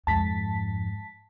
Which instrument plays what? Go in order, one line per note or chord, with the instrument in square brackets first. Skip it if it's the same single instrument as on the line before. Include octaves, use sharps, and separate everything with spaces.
[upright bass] F2 G#2 [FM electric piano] A5 B6